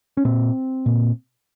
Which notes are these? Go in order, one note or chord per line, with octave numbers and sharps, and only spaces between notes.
C#4
A#2 C4
A#2